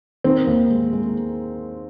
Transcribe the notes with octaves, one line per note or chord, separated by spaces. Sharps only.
D#3 C4
D#2
G#3
G#3